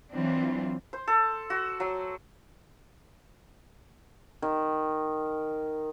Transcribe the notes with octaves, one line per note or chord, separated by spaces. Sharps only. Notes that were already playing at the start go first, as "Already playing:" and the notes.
E3 F#3 C4 D4 F4
C5
A4
F#4
F#3
D#3